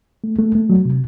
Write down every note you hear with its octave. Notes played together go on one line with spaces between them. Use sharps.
A3
A3
A3
F#3
C3